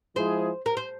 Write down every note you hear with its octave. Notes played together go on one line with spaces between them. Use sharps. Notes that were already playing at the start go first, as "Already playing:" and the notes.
F3 G#3 E4 G#4 C5
A#4
C5